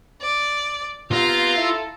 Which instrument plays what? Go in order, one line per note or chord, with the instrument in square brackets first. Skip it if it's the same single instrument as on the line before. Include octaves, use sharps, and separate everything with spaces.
[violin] D5
[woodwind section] G2 B3 C4 [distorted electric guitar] F4 [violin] F5 A#5
[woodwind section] E4 A4